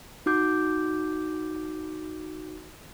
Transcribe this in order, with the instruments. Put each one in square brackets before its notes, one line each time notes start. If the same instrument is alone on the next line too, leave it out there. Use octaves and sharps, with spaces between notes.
[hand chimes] D#4 F#4 D6 G6